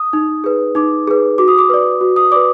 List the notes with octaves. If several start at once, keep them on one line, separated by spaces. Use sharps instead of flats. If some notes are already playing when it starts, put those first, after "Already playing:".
Already playing: D#6
D#4
G#4 B4
D#4 D6
G#4 B4
F#4 D6
D#6
D6
B4 D5
F#4
D#6
B4 D5 D6